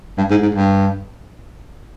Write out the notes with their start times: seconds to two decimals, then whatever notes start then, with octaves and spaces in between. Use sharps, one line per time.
0.18 G2
0.30 G#2
0.42 G#2
0.55 G2